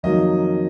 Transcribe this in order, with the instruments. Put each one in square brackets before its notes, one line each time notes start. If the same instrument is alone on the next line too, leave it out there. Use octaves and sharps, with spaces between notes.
[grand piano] F2 D#3 F#3 A#3 D#5